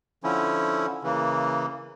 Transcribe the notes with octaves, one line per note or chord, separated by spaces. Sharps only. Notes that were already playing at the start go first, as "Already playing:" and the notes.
D3 F3 C#4 E4
C#3 E3 A#3